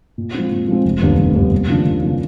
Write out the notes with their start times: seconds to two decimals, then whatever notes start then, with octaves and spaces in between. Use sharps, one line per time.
0.18 A#2
0.34 F3 G#3 C4
0.51 A#2
0.68 F3 G#3 C4
0.86 F1
1.01 D#2 D3 G3 B3
1.19 F1
1.35 D#2 D3 G3 B3
1.52 D#2
1.68 C#3 F3 A#3 D4
1.85 D#2
2.02 C#3 F3 A#3 D4